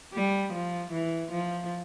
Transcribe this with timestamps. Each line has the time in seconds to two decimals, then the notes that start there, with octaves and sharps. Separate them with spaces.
0.14 G3
0.53 F3
0.92 E3
1.31 F3